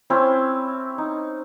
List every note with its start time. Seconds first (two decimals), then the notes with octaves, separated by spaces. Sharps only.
0.10 C4 C#4 E4
0.98 D#4